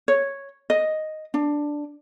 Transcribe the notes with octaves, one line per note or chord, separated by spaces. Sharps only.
C#5
D#5
D4